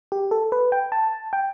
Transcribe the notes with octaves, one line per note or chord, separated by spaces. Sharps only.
G4
A4
B4
G5
A5
G5